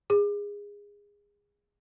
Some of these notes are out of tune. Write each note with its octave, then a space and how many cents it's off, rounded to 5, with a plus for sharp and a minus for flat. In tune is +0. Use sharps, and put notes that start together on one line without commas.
G#4 -20